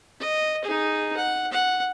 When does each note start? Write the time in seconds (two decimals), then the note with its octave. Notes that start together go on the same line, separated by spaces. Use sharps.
0.20 D#5
0.64 D#4 G#4
1.16 F#5
1.52 F#5